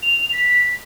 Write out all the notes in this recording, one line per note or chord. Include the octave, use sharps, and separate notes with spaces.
F7
B6